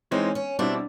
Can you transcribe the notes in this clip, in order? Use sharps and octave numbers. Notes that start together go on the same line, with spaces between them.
E3 G#3 C4 C#4 D#4
C#4
B2 G3 C4 D4 E4